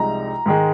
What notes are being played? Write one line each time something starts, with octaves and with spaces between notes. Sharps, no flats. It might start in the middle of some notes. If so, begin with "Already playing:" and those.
Already playing: C2 C3 F3 G#3 D#4 A#5
G#2 D#3 G#3